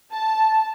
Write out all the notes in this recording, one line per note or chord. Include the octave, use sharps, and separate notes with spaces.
A5